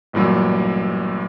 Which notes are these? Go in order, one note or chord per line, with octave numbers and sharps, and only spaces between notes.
A1 G2 A#2 F#3